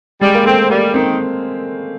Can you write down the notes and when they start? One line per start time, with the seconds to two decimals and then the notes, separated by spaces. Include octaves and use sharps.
0.21 G3 G#3
0.35 A#3
0.45 A3 C4
0.69 G3 A#3
0.94 D#3 C4